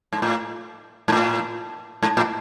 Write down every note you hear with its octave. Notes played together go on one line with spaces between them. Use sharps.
G#2
A2
G#2
A2
G#2
A2